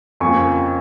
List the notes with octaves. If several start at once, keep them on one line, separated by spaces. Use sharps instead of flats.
F2 C#3 F3 A#3 G#5 C#6